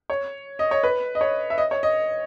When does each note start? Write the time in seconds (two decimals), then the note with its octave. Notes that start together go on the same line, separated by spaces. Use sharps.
0.10 C#5
0.59 D#5
0.71 C#5
0.83 B4
1.15 D#5
1.21 C#5
1.50 E5
1.58 D#5
1.71 C#5
1.83 D#5